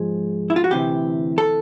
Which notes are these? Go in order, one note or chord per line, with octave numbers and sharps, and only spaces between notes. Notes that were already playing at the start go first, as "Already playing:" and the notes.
Already playing: G#2 F3 G#3
E4
F4
F#4
D2 C3 E3 G4
A4